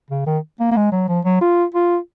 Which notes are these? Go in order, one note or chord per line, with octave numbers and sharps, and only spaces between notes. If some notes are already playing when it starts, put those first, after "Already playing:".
C#3
D#3
A#3
A#3
G#3
F#3
F3
F#3
F4
F4